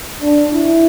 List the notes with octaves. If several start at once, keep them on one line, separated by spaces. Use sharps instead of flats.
D4
E4